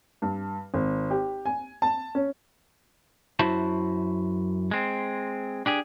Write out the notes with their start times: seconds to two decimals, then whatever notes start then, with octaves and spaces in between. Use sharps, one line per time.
0.22 G2
0.74 G#1
1.10 G4
1.45 G#5
1.82 A5
2.15 C#4
3.39 F#2 E4 F#4 C5 E5 A5
4.71 G#3 C4
5.66 D4 G4 G#4